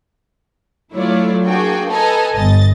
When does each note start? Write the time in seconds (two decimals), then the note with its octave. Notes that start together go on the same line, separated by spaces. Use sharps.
0.92 F#3 A3 E4 F4 C#5 D5
1.45 A#3 D4 F#4 G#4 G5
1.87 A4 B4 D#5 G#5 A#5
2.34 G1 D#5 A6